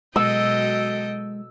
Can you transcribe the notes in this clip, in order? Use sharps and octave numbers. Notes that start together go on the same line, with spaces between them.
B2 F#3 G#3 A4 D#5 G5 E6